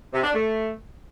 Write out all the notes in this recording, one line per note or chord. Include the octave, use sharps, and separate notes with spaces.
C3
D4
A3